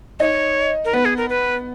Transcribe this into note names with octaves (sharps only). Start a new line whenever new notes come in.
D#4 C#5
A#4
B3 B4
G#4
A#4
B4